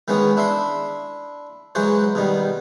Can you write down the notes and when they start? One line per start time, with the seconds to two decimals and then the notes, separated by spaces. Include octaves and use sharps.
0.08 D#3 E3 G#3 B3 C#4
0.37 D4 E4 E5 C6
1.75 E3 F#3 G#3 F#4 C5
2.15 B2 D#3 G3